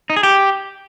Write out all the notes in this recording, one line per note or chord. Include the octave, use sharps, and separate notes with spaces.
D#4
G#4
G4